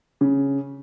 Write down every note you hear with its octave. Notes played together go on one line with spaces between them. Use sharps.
C#3